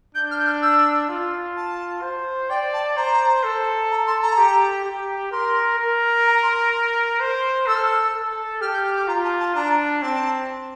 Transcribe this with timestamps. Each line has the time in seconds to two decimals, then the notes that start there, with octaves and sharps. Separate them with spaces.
0.14 D4 G6
0.30 F6
0.39 G6
0.46 F6
0.62 E6
1.09 F4
1.56 A5
2.02 C5
2.49 D5 G5
2.73 A5
2.97 C5 A#5
3.44 A4
3.90 A#5
4.06 C6
4.22 A#5
4.38 G4
4.85 G4
5.32 A#4 C6
5.79 A#4
6.26 A#5
6.42 C6
7.20 C5
7.67 A4 E6
7.75 F6
7.83 E6
8.14 A4
8.61 G4 F6
8.73 G6
8.85 F6
8.96 D6
9.08 F4 A#5
9.24 A5
9.40 A5
9.55 D4 A#5
10.02 C4 A5